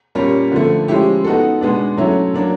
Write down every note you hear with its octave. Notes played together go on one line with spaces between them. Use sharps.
A#2 G3 A#3 C#4
D3 F3 A3
F3 G#3 C#4 E4 G4
B3 D#4 F#4 A4
B2 G#3 B3 D4
F#3 A3 C#4 E4
F#3 A#3 D4